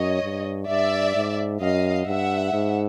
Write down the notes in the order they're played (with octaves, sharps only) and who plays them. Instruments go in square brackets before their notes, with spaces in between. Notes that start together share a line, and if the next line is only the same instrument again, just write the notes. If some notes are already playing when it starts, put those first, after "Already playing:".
Already playing: [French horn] F#2 [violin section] C#5 D#5
[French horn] G2
[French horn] G2 [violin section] D5 E5
[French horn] G#2
[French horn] F#2 [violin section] D#5 F5
[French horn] G2 [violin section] E5 F#5
[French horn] G#2